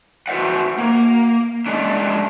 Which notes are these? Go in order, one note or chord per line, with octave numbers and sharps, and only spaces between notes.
F#4 B4 C5 E5 F#5
A#3
G#3 A3 C#4 D4